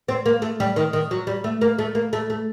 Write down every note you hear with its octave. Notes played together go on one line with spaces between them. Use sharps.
C4
A#3
A3
G3
D#3
D#3
F#3
G3
A3
A#3
A3
A#3
A3
A3